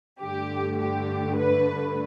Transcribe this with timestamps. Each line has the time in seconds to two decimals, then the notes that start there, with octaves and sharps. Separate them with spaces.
0.21 G2 D3 A3 G4
0.79 G4
1.37 B4